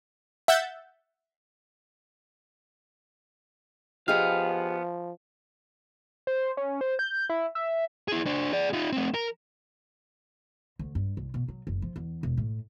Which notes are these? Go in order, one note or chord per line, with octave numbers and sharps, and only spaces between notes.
E5 F#5 E6 G6 A6
F3 B3 G4 G#4 D#5 F5
C5
C#4
C5
G6
E4
E5
E4 G#4
D4 C5
G#4 D5
D#4 F4
A3 C4
A#4
D2
G2
C2
B2
F#3
F#1
F3
E2
E1
A2